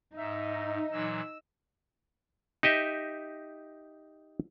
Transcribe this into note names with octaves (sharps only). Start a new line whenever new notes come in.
G#2 D#4 D#5 E5
A#2 E3 F#3 E6
D#4 G4 D#5 E5